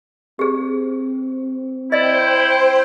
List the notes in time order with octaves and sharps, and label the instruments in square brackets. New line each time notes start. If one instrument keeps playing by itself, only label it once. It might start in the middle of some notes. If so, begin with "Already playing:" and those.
[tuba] C4 [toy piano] G4 G#4
[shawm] E4 [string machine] C5 G5 [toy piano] D5 D#5